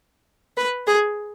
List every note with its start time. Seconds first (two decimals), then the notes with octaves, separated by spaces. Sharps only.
0.57 B4
0.87 G#4